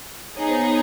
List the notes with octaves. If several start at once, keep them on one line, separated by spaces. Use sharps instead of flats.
B3 D#4 G#4 C#5
C5
C#5